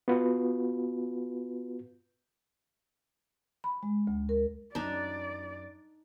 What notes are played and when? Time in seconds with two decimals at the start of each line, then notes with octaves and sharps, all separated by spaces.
0.08 B3 F4 F#4 B4
3.64 B5
3.83 G#3
4.07 D2
4.29 A#4
4.75 F#2 D4 D#4 D5